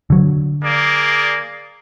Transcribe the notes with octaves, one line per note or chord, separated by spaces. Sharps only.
D3 F#3
A#3 G#4 D5